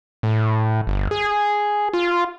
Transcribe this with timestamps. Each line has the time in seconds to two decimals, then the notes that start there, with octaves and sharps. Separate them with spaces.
0.23 A2
0.87 G1
1.11 G#4
1.94 F4